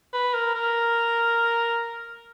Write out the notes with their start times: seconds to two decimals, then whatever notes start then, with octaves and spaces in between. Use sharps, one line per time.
0.13 B4
0.34 A#4
0.55 A#4